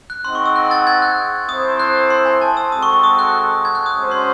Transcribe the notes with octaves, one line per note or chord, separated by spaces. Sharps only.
F#6
C4 D#4 G#4 D#5 F#5 C6
C#6
E6
F#6
A6
G#6
F#6
C4 E4 A4 C5 D#6
F#6
C6
G#5
A5
E6
G#3 C4 F#4 A4 D#6
C#6
C#6
D#6
F#6
G#6
F#6
D#6
G#3 C#4 F#4 C5
C6